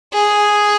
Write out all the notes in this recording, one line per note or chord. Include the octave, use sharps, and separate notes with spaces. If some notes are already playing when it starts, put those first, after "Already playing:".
G#4